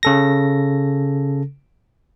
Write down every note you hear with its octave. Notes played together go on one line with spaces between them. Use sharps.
C#3 A4 A#6